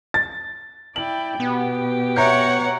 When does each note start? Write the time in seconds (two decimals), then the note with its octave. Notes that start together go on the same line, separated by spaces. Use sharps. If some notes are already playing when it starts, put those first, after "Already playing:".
0.14 A6
0.96 E4 D5 G5 F#7
1.40 B2 B3 G4
2.16 C#5 E5 F#5 A#5 G6